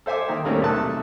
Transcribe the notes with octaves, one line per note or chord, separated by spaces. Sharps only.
A4 C5 E5 G#5 D6
D#3 A#3 G5
D#2 G3 A3 A#3 C4 C#4
B1 C3 A3 A4 A5 F#6